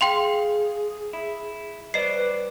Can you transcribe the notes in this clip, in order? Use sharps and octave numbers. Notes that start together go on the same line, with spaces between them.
G#4 F5 G5 C6 F7
E4
G3 B4 C5 D5 D#5 C7